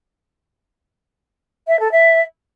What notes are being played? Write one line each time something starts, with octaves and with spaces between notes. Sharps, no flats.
E5
A4
E5